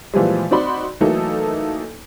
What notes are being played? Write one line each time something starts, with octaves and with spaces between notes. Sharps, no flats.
A#2 E3 F3 G3 G#3
C4 D#4 F#4 D5 B5 C6
E3 F#3 A3 A#3 D#4 A4